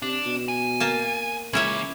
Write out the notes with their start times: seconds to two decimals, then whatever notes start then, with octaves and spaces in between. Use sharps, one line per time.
0.02 C3 D4
0.26 B2
0.48 G#5
0.80 A#3 A5
1.53 C#2 E3 A#3 C#4 E4 C#5